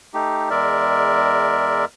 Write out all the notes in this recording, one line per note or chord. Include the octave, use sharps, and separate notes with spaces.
A3 D#4 G4
E2 G#3 A#4 D5 E5